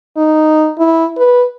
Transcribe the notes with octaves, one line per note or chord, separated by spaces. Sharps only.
D#4
E4
B4